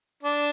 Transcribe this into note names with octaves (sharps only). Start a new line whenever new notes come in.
D4